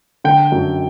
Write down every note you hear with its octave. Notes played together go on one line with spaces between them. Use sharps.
D3 G5
F#2